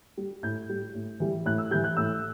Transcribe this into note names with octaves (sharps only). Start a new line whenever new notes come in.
G3
A2 G6
G3
A2
E3 G3
A2 F#6
E6
E3 G3 G6
F#6
A2 E6